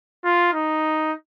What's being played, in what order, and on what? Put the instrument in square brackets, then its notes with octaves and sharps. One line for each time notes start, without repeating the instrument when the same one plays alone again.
[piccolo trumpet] F4
D#4